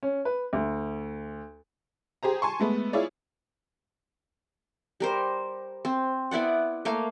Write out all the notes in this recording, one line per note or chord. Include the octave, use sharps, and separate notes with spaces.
C#4
B4
D2
G4 G#4 C5 A#5
G#5 A5 C6 C#6
G#3 A3 B3
E4 F4 G#4 C#5 D5
G3 A#4 C5
C4
B3 E4 D5 F#5
A3 A#3 F5